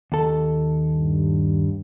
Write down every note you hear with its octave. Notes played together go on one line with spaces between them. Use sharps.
D#2 A4
G2